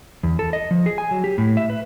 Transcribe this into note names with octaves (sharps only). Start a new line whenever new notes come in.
E2
A4
D#5
F3
G#4
G#5
F#3
G4
A2
E5
B4